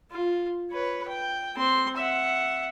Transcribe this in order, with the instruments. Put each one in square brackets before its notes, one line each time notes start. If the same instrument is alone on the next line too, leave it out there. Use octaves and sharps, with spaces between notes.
[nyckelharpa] F4
B4 C#5
G5
C4 C6
E5 F#5